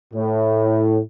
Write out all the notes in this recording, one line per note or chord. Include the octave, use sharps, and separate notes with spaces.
A2